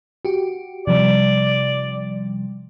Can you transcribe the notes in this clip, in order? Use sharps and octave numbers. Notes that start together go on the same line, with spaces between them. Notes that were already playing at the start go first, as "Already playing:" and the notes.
F#4 G4
C3 F3 G3 D5